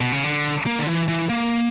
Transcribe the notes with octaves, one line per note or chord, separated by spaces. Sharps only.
B2
C#3
D3
A#3
D3
E3
E3
A#3